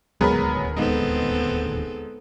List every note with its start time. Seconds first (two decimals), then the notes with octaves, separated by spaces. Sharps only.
0.21 D#1 D2 F#3 G#3 B3 G#4 A#4 B5
0.77 G#3 B3 C4 D#4 A4